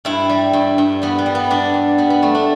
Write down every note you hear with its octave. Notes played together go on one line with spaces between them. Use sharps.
G2 E4
G3
G2
G2
G3 B3
B3
G3
B3
G3 D4
G2
G3 B3
B3
G3 A3
D4